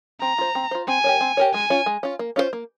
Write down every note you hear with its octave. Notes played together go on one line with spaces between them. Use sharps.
C4 A#5
F4 C5
C4
F4 C5
C4 G#5
G4 A#4 C#5
C4
G4 A#4 C#5
G#3 G#5
C#4 F4
G#3
C#4 F4
A#3
C#4 F4 G#4 C5
A#3